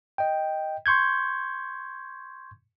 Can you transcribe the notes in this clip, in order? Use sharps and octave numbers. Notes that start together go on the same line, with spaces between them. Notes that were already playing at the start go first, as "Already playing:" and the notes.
D#5 G5
C6 C#6 G6 G#6